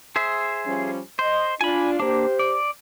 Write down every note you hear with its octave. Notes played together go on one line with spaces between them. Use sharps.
G#4 C5 E5
F3 G3 C#4
C5 D#5
D4 F4 G#5 B5
A#3 D4 G4 C5
D5